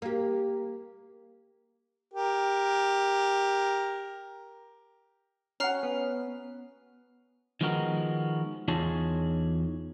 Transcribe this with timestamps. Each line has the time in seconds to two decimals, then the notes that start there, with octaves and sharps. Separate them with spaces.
0.02 A#3 G4
2.14 G4 A#4
5.60 C#4 F#4 F#5 A#5 F6 C7
5.83 B3
7.61 D#3 F3 G#3 B3 F#4 A#4
8.68 E2 D#4 F4 G#4 C#5 A5